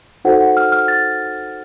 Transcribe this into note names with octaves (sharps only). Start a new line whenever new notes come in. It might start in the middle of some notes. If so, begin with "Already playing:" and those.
D#4 F#4 A4 C5 F#5
F#5
F6
F6
A6